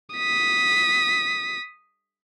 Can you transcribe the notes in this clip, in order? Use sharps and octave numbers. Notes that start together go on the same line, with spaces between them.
D#6 B6